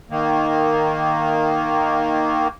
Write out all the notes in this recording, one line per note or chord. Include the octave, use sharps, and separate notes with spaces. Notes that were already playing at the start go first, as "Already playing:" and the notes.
D#3 A#3